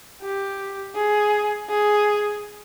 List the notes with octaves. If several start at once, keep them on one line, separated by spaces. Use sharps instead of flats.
G4
G#4
G#4